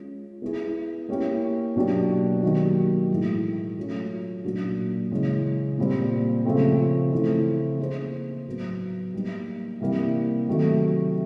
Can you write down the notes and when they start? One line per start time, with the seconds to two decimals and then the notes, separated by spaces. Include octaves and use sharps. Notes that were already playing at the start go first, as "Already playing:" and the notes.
Already playing: G#3 C#4 F4
0.42 B3 E4 G#4
1.09 A#3 C#4 E4 G4 A#4
1.75 B2 F#3 A#3 D4 G4
2.43 D#3 F#3 A#3 D#4 G4
3.10 A2 E3 G#3
3.77 F#3 A3 C#4 F4
4.44 A#2 F#3 A#3 D4 F#4
5.11 C#3 E3 G#3 C#4
5.78 A#2 G3 C4
6.45 C#3 F3 A3 C4
7.12 C#3 E3 A3 C4 E4
7.79 A#3 D#4 G#4 C5
8.47 A2 F#3 B3
9.13 G3 A#3 D#4
9.80 C3 E3 G3 A#3
10.47 C3 D#3 F#3 A3